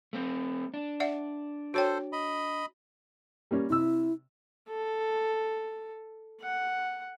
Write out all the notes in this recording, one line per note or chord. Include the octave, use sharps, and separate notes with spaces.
A3 C4
D4
D5 E5 F#5
F#4 A4 C5 C#5 G5
D#5 B5
G3 A#3 C#4
C3 E4 E6
A4
F#5